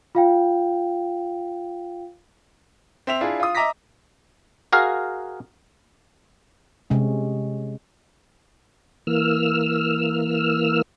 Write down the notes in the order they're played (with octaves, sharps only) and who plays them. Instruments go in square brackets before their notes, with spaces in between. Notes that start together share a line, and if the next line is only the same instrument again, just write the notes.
[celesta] F4 F5 G5
[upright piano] C4 E5 F7
D4 E4 F4 G#4
F4 D#6
D#5 E5 A#5 D6 A#6 B6
[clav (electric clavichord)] F#4 G#4 A#4 F5
[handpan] C3 G#3 C#4
[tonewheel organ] E3 A#3 E6 F6